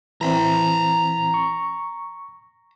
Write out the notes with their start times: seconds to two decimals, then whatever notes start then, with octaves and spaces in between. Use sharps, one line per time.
0.21 E3 C4 A#5 B5
1.34 C#6